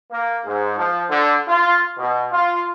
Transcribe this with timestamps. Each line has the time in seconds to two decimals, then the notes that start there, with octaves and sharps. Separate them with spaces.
0.11 A#3
0.45 G#2
0.77 F3
1.10 D3
1.48 F4
1.98 B2
2.32 F4